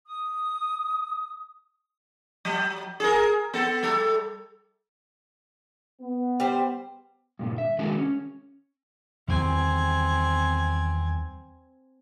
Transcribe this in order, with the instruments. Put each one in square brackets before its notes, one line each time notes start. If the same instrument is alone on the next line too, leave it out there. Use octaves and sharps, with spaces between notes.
[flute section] D#6
[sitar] F#3
G#4 A#4
B3 A4
G3 A4
[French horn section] B3
[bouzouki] G3 C5
[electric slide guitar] G2 A#2 D3
E5
D#3 G#3 D4 F#4 G#4 A#4
C#4
[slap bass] E2 D#3 G3 [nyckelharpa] C4 G#5